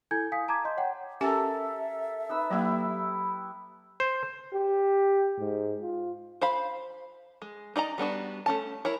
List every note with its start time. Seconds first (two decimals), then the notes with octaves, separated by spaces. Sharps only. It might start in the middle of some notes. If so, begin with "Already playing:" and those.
0.11 E4 A4 G#5 G6 G#6
0.32 F5 G#5 D#6 B6
0.48 A5 A#5 D6 G#6
0.65 D#5 A5 C6 G6
0.77 C#5 F#5 G5
1.21 C#4 G4 A4 A#4 E5 G#5
2.29 D#4 B4 E6
2.50 F#3 A#3 E4 G4
4.00 C5
4.53 G4
5.39 G#2
5.82 F4
6.41 C5 F5 B5
7.42 G#3
7.76 D#4 D5 D#5 A#5
7.98 G3 B3 D4 F#4
8.46 A3 C#4 A5
8.85 E4 A#4 C#5